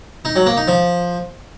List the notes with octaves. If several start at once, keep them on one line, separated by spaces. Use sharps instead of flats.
D#4
F#3
A#3
D#4
F3